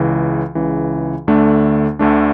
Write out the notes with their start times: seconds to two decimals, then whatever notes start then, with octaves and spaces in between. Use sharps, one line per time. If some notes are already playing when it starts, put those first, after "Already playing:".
Already playing: C#2 C#3 E3
0.55 C#2 C#3 E3
1.28 D2 D3 A3 D4
1.99 D2 D3 A3 D4